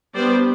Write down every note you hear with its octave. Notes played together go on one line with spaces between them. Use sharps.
G3 B3 D4 C5 D5